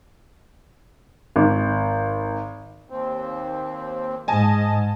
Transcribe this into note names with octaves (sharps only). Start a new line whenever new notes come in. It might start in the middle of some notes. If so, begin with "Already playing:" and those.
G#1
D#2 C4
G#2 D#5 G#5 A5